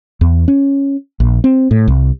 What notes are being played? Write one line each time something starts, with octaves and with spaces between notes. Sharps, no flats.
E2
C#4
A#1
C4
A2
C2